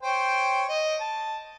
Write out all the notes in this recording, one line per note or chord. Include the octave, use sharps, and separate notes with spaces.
C5 C#5 G5
D#5
A5